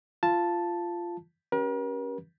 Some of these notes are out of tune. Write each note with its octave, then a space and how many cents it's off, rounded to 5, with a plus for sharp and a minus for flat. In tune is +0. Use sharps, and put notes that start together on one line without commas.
F4 -15 A5 +0
C#4 +0 G4 -20 A#4 +45